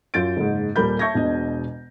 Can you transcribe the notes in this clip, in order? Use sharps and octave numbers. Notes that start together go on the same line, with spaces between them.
F#2 F4 G6 A6 D7
F#1 G#2
D#1 G3 A#4 B5 G6
E5 A5 C#6 G6 G#6 A#6
E1 B2 D4 D#5